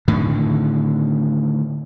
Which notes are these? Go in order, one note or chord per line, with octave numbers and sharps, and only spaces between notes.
A2 D3 D#3